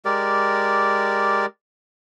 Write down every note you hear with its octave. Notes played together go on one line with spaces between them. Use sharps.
G#3 G4 A#4 D5